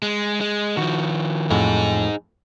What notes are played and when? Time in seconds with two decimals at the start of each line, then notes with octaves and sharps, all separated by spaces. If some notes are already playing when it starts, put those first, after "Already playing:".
0.02 G#3
0.41 G#3
0.77 D#3 F3 F#4
1.50 F2 A2 F#3 D#4 G#4